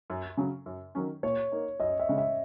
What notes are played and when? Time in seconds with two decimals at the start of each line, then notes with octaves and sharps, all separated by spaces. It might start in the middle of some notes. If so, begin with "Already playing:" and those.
0.10 F#2
0.37 C#3 F#3 C#4
0.66 F#2
0.95 D#3 F#3 C#4
1.23 A#2 C#5
1.52 A#3 D#4
1.80 F#2 D#5
2.00 E5
2.09 C#3 G#3
2.18 E5